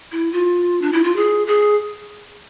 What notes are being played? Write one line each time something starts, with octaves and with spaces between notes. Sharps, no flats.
E4
F4
D4
E4
F4
G#4
G#4